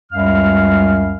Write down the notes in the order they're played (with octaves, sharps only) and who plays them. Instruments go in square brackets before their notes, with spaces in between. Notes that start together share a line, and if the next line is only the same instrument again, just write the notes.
[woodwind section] C#2 F#2 G3 F5 F6